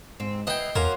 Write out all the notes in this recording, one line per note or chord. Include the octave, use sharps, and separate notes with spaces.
G#2 C4
E3 B3 D#5 G5 C7
E2 F#3 A#3 C#4 A#4 C6